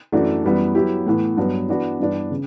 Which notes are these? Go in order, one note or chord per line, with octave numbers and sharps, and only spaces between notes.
F#2 E3 A3 D4 F#4
F#2 E3 G3 B3
F#3 B3 E4 G4
A2 E3 B3
G2 F#3 B3
E3 B3 D4 F#4 B4
G2 E3 B3 D4
C#3